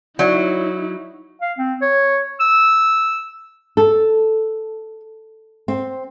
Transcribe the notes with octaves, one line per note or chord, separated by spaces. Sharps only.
F#3 D#4 E4 C#5 D5 E5
F5
C4
C#5
E6
A4
C4